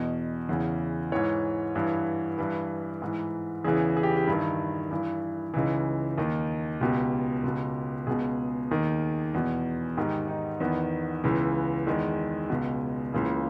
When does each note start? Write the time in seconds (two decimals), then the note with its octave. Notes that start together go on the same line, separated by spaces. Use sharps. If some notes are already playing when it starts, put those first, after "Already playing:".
Already playing: E2 B2 D#5
0.49 E2 C#3 E3
1.12 G#2 E3 C#5
1.75 G2 E3
2.38 G2 E3 B4
3.02 G#2 E3
3.64 E2 C#3 E3 G#4
3.97 G#4
4.03 G4
4.11 E4
4.17 G4
4.27 G2 D#3 E4
4.91 G2 E3
5.54 C#2 C#3 E3 D#4
6.18 D#2 D#3
6.81 C#2 B2 G4
7.44 C#2 B2
8.07 C#2 B2 G#4
8.71 D#2 D#3
9.34 E2 B2
9.97 G#2 D#3 G4
10.28 D#4
10.60 E2 D#3 B3
11.24 C#2 C#3 E3
11.87 E2 D#3 G#3
12.50 C#2 B2
13.13 C#2 C#3 E3 A#3